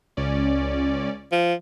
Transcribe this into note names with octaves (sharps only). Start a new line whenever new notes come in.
C#2 C#4 D5
F3